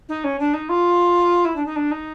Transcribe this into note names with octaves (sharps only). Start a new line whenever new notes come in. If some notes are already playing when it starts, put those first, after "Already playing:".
D#4
C#4
D4
D#4
F4
E4
D4
D#4
D4
D#4